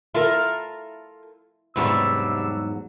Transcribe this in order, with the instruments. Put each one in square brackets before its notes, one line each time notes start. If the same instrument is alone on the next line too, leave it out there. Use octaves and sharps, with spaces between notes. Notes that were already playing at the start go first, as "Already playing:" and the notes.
[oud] E4 [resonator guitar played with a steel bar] F4 A4 A#4
[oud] E2 G#2 F#3 [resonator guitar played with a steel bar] C3 G3 D4 [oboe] E6